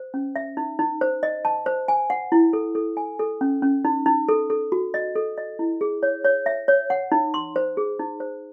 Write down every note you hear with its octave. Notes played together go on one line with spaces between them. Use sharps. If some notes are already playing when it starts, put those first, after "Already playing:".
Already playing: C5
C#4
E5
D#4
D#4
C5
D#5
A5
C5
G#5
F#5
E4
A4
A4
G#5
A4
C#4
C#4
D#4
D#4
A4
A4
F#4
D#5
A4
D#5
E4
G#4
C#5
C#5
E5
C#5
F#5
D#4
C6
C5
G#4
D#4
C5